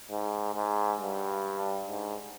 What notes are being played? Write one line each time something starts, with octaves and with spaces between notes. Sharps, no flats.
G#2
G#2
G2
G#2